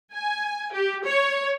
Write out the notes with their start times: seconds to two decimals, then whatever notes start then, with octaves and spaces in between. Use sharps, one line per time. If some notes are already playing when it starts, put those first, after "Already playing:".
0.14 G#5
0.73 G4
1.04 C#5